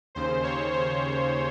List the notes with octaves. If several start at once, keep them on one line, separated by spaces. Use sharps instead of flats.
D#2 C#3 C5
C#5
C5